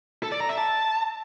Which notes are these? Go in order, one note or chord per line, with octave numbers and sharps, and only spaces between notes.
A4
D5
A#5
E5
A5